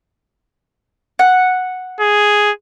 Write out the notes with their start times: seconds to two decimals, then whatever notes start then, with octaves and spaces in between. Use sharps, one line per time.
1.19 F#5
2.00 G#4